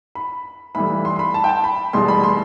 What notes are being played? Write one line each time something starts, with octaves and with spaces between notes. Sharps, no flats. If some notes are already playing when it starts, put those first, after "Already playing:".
B5
B1 A2 E3 G3 B5
C6
C6
B5
A5
G5
A5
B5
F1 E2 B2 G3 C6
B5
C6